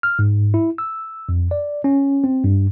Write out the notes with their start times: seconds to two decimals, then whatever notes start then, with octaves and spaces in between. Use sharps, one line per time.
0.03 F6
0.19 G#2
0.54 E4
0.78 E6
1.29 F2
1.51 D5
1.84 C#4
2.24 C4
2.44 G2